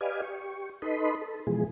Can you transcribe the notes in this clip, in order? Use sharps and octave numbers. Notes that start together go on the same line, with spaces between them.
G4 B4 D5 D#5 F5 G#5
G4 C#6
D#4 A4 B4 D#5 B5 C6
A4
B2 E3 F3 G#3 G#4